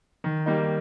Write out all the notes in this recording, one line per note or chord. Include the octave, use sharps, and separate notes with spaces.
D#3
G3 A#3 D#4